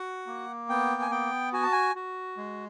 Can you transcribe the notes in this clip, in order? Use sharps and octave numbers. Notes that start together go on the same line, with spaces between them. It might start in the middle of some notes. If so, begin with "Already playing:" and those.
Already playing: F#4 F#5
A#3
B3 G5
G#5
B3 G5
F#4 G#5
A5
G#5
F#4
G#3